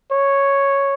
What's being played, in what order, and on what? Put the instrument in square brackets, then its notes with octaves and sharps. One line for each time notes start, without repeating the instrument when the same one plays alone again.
[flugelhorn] C#5